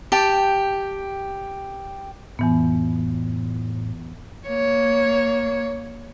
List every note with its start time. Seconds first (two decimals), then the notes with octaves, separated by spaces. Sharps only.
0.12 G4 G5 A5
2.39 F2 A2 E3 B3
4.48 A#3 C#5